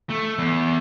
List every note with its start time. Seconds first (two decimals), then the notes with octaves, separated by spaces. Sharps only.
0.10 A3
0.39 E2